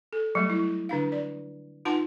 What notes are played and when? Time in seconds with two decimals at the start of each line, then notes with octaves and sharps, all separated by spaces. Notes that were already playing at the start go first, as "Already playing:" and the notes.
0.13 A4
0.35 F#3 G3 A3
0.50 E4
0.89 D3 D4 F5
1.12 D5
1.85 D#4 F4 B4 F#5 A5 C6